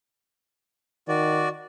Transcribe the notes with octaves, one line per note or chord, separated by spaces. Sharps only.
D#3 F#4 D5